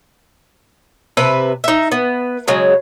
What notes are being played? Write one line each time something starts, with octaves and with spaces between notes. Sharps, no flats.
C3 B4 E5
D#4 E5
B3
C#3 F#3 G#3